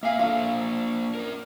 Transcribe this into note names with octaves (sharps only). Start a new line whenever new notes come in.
A#3 E5 F5 G#5
A#3 D4 F4 A4 F5
C#4 A#4